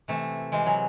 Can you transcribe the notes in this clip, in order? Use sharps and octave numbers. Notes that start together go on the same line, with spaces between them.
C3 E3 A3
C3 E3 G#3
F#3